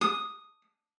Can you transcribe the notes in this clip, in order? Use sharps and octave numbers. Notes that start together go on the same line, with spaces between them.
D#6